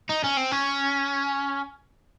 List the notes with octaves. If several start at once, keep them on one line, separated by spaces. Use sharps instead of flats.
D#4
C#4
C4
C#4